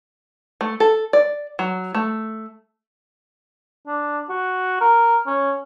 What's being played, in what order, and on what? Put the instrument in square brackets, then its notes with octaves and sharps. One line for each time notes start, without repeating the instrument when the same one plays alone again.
[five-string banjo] A3
A4
D5
F#3
A3
[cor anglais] D4
F#4
A#4
C#4